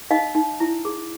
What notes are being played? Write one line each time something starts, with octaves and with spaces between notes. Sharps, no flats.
D#4 D#5 F5
D#4
E4
G#4